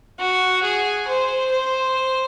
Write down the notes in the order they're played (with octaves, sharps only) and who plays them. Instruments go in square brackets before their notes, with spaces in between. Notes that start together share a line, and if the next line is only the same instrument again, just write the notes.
[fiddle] F#4
G#4
C5
C5